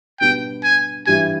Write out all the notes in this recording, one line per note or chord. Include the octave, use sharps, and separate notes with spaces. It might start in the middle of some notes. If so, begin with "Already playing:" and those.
B2 G3 B3 D4 G5
G#5
G2 E3 G3 G#5